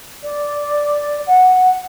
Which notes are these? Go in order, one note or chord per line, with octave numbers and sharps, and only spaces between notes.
D5
F#5